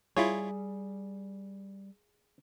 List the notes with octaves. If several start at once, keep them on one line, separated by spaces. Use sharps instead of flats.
G3 E4 F4 G#4 C#5